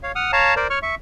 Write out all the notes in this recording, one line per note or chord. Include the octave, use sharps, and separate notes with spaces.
C#5 F5
F#5 D#6 F6
C#5 F5 A5 A#5
A#4 C5 D5
C#5 C#6 F6
E5 C#6